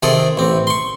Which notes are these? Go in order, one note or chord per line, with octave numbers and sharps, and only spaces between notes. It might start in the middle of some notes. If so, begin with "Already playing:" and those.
C3 D#3 G#4 A4
A1 C4
C6 C#6